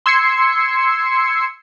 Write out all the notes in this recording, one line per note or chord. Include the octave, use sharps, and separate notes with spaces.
C6 E6 G#6 C7 C#7